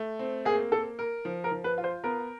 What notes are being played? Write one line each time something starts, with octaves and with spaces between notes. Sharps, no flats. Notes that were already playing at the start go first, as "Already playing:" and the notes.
Already playing: A3
C4
A#3 G#4
A#3 A4
A#4
F3
A#4
F3
B4
F4
C5
B3 A#4